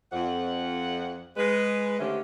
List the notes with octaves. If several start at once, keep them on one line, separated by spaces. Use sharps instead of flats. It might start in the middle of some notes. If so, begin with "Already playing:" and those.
F2 F#5
G#3 B4
D3 D#3 A3 C#4 G4 C5